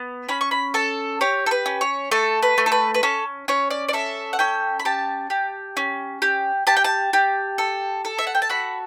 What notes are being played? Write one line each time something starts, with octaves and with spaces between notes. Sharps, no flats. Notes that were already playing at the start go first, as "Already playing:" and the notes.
Already playing: B3
C#4 B5
C#6
B5
A4 A5
G4 C#5
A4
B4
C#4
C#5
A3 A4
B4
A3
A4
B4
B4
C#4 A4
C#4 C#5
D5
D5
A4 E5
F#5
C#4 G5
B5
G4 A5
G4
C#4
G4
G4 A5
G5
A5
G4
A4
A4
E5
F#5
G5
A5
F#4 B5